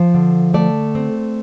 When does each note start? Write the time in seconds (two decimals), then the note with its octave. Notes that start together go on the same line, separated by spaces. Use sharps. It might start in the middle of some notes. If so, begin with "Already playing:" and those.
Already playing: F3 C5
0.14 D3
0.54 A3 D5
0.95 C4